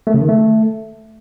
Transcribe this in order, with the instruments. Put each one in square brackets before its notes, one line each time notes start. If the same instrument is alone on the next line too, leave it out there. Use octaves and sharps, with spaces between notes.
[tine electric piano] A3
C#3
D#3
A3